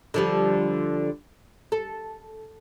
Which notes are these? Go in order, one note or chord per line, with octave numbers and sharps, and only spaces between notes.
D3 F3 G3
A4